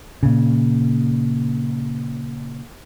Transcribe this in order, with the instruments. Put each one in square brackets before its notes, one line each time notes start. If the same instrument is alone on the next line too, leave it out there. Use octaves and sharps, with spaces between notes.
[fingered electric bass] A#2 C#3